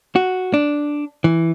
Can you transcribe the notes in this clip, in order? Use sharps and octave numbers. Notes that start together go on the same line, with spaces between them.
F#4
D4
E3